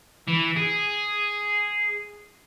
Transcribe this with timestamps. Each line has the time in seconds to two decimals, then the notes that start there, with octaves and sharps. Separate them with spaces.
0.28 E3
0.57 G#4